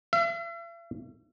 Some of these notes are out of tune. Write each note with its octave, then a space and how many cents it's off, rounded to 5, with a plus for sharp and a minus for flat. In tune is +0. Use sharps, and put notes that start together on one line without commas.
E5 +45